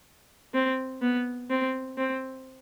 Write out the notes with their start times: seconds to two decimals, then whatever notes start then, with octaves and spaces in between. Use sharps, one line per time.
0.54 C4
1.02 B3
1.50 C4
1.97 C4